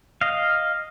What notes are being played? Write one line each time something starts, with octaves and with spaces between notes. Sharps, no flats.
D#5 F5